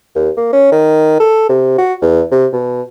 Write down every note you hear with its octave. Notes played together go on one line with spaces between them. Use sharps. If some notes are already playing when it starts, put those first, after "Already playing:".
D#2
A#3
C#4
D#3
A4
C3
F#4
E2
C3
B2